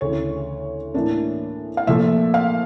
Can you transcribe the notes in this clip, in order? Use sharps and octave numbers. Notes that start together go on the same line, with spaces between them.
D2 C#3 E3 C#5
A2 E3 A#3 D4
F5
A#2 F3 A3 E5
F5